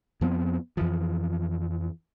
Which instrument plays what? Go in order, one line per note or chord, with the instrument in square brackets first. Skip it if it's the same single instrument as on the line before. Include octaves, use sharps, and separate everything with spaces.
[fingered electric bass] F2 F3 B3 C4
F2 E3 F3